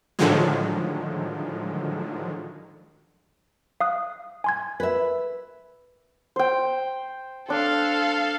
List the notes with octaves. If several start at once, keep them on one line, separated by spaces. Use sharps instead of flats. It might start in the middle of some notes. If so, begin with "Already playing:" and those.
A2 D3 D#3 F3 F#3 G#3
F5 D#6 F#6
G#5 C6 G#6
B4 E5
C5 G5
D4 A4 F5 C6